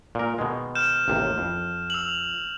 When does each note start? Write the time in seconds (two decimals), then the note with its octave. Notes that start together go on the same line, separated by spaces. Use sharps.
0.15 A#2 A#4
0.38 B2 D#3 G#3
0.75 F6 G6 E7
1.08 A1 D#2 C3
1.38 F2
1.90 E6 F7 F#7